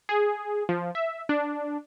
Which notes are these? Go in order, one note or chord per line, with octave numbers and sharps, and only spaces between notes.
G#4
F3
E5
D4